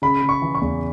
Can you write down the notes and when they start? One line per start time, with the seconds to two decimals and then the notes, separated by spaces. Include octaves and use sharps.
0.02 C#3 B5
0.22 C#3
0.29 C#6
0.42 E3
0.55 C#6
0.62 E2